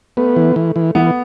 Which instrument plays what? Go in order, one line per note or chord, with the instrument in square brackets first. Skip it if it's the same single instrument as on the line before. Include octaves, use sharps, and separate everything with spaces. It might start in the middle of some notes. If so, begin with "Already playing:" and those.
[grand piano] A3 [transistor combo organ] B3
[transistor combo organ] E3
E3
E3
[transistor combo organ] E3 [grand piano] B3